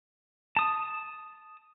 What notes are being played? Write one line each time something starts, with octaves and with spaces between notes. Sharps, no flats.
A5 D#6